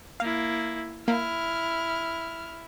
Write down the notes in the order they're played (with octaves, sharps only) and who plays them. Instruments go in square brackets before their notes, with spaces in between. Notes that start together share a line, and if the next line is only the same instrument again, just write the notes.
[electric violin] A#3 E4 [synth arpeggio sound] F5
[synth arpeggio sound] A#3 [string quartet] E4 [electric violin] F6